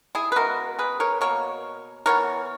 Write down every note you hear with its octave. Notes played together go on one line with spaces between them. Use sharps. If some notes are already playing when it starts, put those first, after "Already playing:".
E4 G#4
B4
C#3 G#3 B3 F#4 A#4
G#4 B4
A#4 C#5
B2 A#3 A#4 C#5
E3 B3 A#4 C#5